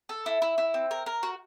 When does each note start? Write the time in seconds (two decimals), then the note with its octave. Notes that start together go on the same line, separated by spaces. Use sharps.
0.09 A4
0.26 E4
0.42 E4
0.58 E4
0.74 C4
0.91 A#4
1.06 A#4
1.23 F#4